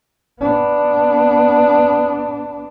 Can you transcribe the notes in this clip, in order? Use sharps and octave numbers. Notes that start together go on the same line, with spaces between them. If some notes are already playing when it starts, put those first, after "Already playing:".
B3 D4